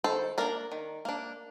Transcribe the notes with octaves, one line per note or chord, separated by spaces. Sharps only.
D#3 A4 C5
A#3 D4 A#4 D5
D#3
A#3 D4